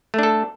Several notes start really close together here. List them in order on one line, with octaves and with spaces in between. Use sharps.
A3 D4 A4